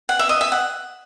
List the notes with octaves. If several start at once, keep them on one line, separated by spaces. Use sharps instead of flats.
F#5
E5
D#5
E5
F#5